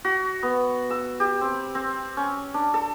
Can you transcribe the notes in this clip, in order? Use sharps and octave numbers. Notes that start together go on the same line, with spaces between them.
F#4
B3
E6
G4
C4
C4
C#4
D4
A4